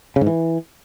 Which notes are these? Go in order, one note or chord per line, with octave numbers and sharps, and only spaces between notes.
C#3
G#2
E3